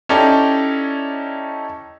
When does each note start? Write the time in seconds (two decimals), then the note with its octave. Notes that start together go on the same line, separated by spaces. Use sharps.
0.09 C#4 D#4 E4 G4 A4 D5